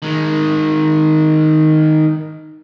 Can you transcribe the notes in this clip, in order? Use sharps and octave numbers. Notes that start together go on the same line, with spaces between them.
D#3 G#3